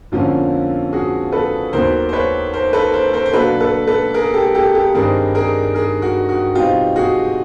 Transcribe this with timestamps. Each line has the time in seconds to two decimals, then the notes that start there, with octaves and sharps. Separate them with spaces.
0.12 F2 D3 F3 A#3 C#4 F4
0.93 F#4 G#4
1.32 A4 B4
1.73 D#2 D#3 F#3 B3 A#4 C5
2.09 C5
2.13 B4 C#5
2.53 A#4 C5
2.73 A4 B4
2.93 A#4 C5
3.13 A#4 C5
3.26 C5
3.33 B2 F#3 A#3 D4 A4 B4
3.61 A4 B4
3.87 A4 B4
4.14 G#4 A#4
4.34 G4 A4
4.55 G4 A4
4.75 G4 A4
4.94 G2 D#3 G3 C4 D#4 G#4 A#4
5.35 G#4 A#4
5.74 G#4 A#4
6.02 F#4
6.29 F#4
6.55 B2 G3 C4 D#4 F4 G4
6.96 F#4 G#4